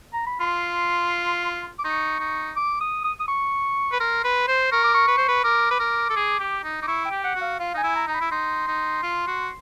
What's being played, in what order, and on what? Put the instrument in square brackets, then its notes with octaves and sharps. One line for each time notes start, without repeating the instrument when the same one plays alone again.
[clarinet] A#5
B5
[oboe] F4 [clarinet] C6
[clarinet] D6
[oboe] D#4 [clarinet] C#6
[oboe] D#4
[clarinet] D6
D#6
D#6
D#6
C#6
[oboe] B4
[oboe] A#4 [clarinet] C6
[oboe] B4
C5
[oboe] A#4 [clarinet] C#6
[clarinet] D6
C#6
[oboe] B4
C5
B4
[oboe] A#4 [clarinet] D6
[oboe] B4
A#4
A4
G#4
G4
D#4
[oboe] D#4 [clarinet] D6
[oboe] E4 [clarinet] C#6
[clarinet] G5
[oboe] G4
[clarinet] F#5
[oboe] F#4
[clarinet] F5
[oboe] F4 [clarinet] F5
[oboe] D#4 [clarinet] G#5
[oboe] E4
[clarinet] A#5
[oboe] D#4 [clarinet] A#5
[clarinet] B5
[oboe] E4
[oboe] D#4 [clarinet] C6
[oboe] D#4
F4
F#4